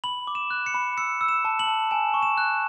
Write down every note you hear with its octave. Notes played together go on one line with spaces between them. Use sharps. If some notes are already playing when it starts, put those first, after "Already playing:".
B5 F#7
D6
E7
F#6
C#7
B5
E6 C#7
E6
E7
A5
F#7
A5
G#5 E7
C#6
E7
F#6